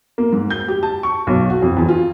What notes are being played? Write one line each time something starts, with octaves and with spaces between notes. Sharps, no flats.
A#3
G#2
G6
G4
A5
C#6
B1
F#4
F2
E2
F4